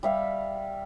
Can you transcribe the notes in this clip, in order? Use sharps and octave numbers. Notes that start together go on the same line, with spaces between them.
G3 E5 F5